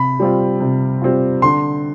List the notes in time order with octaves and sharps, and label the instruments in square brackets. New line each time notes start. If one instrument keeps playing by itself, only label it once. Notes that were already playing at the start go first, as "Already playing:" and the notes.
Already playing: [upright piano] C3 [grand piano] B5
[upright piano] G3 C4 F4
C3
G3 C4 F4
[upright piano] D3 [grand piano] C6